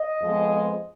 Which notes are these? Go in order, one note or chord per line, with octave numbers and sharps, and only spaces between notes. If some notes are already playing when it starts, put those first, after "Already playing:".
Already playing: D#5
F2 F3 G#3 B3